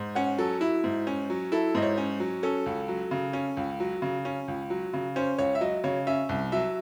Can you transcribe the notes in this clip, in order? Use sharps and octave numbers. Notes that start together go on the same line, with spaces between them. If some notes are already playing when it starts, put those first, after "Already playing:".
Already playing: G#2
C#4 F#5
F#3 A4
E4
G#2
C#4
F#3
E4 A4
G#2 D#5
C#5
C#4
F#3
C#4 A4
C#2
F#3
C#3
C#4
C#2
F#3
C#3
C#4
C#2
F#3
C#3
C#4 C5
C#2 C#5
E5
F#3 D#5
C#3 C#5
C#4 E5
C2
F#3 E5